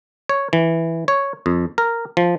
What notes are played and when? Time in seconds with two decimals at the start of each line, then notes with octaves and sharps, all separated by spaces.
0.29 C#5
0.53 E3
1.08 C#5
1.46 F2
1.78 A#4
2.17 F3